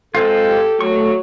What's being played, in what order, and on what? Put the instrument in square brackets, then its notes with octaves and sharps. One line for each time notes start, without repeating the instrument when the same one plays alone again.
[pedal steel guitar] G#3 C4 F4 [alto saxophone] A4
[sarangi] G4
[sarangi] F#3 [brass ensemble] A3 [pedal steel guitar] C#6